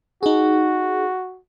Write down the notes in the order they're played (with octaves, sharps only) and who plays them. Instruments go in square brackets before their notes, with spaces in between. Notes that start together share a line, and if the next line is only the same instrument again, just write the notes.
[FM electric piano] D#4 G#4 [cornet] F#4